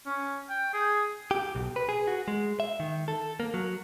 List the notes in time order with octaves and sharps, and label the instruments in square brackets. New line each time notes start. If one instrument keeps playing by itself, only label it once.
[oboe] C#4
G5
G#4
[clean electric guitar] G4
B1
B4
G#4
F#4
G#3
E5
D#3
A4
A#3
F#3